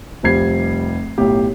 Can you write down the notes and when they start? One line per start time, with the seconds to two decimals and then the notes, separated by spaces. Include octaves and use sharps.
0.23 F1 F3 G3 G#6 C7
1.18 B1 A2 G4